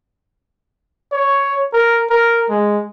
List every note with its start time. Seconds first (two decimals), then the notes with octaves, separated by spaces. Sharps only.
1.12 C#5
1.73 A#4
2.10 A#4
2.49 G#3